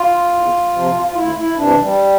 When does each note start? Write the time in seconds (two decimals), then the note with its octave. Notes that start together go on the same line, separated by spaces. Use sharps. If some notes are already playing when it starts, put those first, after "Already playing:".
Already playing: F4
0.31 E2
0.73 C3 F3
1.03 F4
1.14 D2 E4
1.36 E4
1.56 C3 E3 D4
1.79 G3